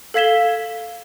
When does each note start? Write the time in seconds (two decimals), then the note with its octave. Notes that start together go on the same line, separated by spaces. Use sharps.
0.14 A4 F5 G#6 B6 E7 G7